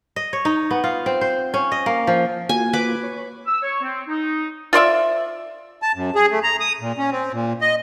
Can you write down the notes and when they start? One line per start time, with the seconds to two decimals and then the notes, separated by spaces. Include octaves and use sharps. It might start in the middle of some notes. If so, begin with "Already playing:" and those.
0.16 D#5
0.33 C#5
0.45 D#4
0.71 B3
0.84 F4
1.06 C4
1.21 C5
1.54 C#4
1.72 D#5
1.86 A#3
2.07 F3
2.49 A#3 F4 F#4 G#5
2.73 B4 D6
3.03 C#5
3.47 E6
3.63 C#5
3.82 C4
4.08 D#4
4.73 F4 C5 D5 E5
5.82 A5
5.95 F#2
6.15 G#4
6.31 A3
6.43 A#5
6.60 D#6
6.81 A#2
6.98 C#4
7.11 C4
7.32 A#2
7.61 D#5